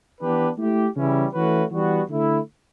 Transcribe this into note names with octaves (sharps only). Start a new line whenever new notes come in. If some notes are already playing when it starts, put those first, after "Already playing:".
E3 B3 D4 G4 B4
A3 E4 G4
C#3 E3 G3 C#4 E4
E3 A3 C#4 F#4 B4
E3 G3 B3 F#4
D3 A3 E4